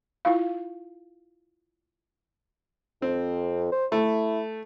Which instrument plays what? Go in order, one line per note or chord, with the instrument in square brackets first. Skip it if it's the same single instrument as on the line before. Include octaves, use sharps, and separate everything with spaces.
[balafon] E4 F4 F5
[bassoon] F2 [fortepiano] C4
[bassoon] C5
[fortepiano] A3 [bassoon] E4